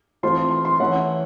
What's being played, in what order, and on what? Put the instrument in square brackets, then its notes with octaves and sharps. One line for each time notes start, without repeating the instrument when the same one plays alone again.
[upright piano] E3 A3 C4 F4 [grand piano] C6
[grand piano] C6
C6
[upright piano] E3 A3 C#4 E4 [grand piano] F#5